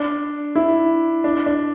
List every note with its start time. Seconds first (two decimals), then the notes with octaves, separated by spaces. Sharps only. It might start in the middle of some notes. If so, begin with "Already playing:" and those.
Already playing: D4
0.56 E4
1.24 D4
1.46 D4